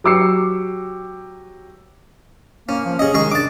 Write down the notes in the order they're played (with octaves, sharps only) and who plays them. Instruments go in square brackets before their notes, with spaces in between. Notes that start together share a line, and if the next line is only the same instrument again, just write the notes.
[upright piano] F#3 G4 D6 E6 C7 C#7
[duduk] A#3 [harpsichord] C#4
[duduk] F3
[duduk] C#4 [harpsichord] G#4 D#5
[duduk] D#3 [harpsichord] G#3 G#4 C#6
[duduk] D4 [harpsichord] A5 D6